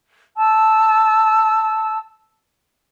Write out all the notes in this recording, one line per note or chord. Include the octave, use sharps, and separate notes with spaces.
A5 E6